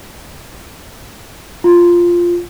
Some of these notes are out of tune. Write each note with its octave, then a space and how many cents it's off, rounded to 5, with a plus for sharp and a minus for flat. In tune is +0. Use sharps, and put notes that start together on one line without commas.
F4 -5